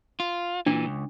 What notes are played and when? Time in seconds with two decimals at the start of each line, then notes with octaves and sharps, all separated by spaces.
0.20 F4
0.66 A#2 E3 D4
0.85 C#2